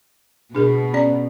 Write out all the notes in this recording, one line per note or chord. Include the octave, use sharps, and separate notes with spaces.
B2 D4 G#4 A#4
C#4 D5